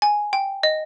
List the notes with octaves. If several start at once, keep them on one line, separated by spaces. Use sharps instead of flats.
G#5
G5
D#5